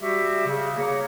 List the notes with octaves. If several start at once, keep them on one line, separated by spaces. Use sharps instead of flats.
G3 F#4 G4 E5
C#3
A#3 C#5